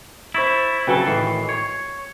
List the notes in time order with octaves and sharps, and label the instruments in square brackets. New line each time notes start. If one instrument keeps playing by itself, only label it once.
[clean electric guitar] E4 [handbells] C5 C#6 A6
[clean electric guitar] C#3 F#3 A4 [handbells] F#4 B4 G5
[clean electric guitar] A2 D#3 E3 [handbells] C7
[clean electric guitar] C#5